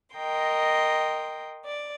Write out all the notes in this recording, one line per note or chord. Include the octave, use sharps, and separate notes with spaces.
A#4 D#5 G5 C6
D5